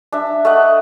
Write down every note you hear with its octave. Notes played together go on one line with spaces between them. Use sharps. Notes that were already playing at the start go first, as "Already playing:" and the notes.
D4 E5
A3 D#5 F#5